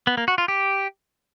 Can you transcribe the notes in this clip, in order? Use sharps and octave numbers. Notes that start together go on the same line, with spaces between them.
B3
A#3
F#4
F4
G4